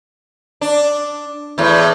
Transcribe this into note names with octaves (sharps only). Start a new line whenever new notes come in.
D4
E2 A2